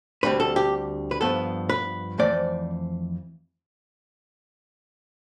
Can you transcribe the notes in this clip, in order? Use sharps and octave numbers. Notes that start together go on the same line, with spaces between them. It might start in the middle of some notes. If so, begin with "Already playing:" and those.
D2 D3 G3 C4 B4
A4
G4
B4
G2 F3 B3 A4
B4
F2 E3 A3 C4 D5